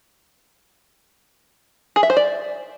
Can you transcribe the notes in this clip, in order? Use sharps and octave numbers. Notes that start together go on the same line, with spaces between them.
G#4
E5
C5
D5